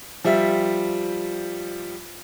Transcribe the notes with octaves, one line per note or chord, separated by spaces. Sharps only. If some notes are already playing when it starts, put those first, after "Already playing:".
F3 G3 E5